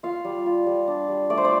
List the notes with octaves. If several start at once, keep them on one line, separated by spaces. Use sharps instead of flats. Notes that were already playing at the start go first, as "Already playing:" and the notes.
F4 F5
G3
F4
G3
D4
G3
A3 D5
C5
D5